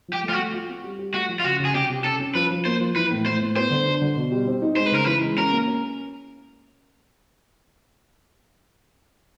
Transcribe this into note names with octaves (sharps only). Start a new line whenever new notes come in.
F3 G4
A3
F4
F#4
A3
F4
C4
G3
G3
A3 F#4
F3
F4
C#3 F#4
C#3
G#4
C3 G4
C3
C#4 A4
C#4
F3 B4
F3
A#3 C5
F3
E3 B4
A2
A2 C5
A2
B3 C5
D3
D4
D3
B2
G3
C4
D#4
G#3 C5
B4
C#3 A#4
E3 B4
G#3
C#4 A#4
A#3
C#4